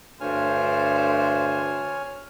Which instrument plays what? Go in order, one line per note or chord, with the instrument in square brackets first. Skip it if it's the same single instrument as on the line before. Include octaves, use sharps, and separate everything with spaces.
[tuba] D2 [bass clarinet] G2 [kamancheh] D4 C5 [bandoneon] C#5 G#5 F6